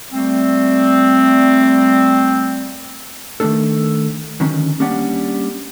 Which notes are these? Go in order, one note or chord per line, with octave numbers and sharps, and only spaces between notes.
G3 A3 C4
D#3 A3 A#3 C#4 D4 A4
D3 D#3 F#3 C#4
G3 A#3 C#4 D4 D5 F#5